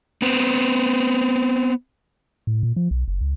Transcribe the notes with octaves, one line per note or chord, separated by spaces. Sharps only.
B3 C4
A2
A#2
F3
B1
F#1
C#2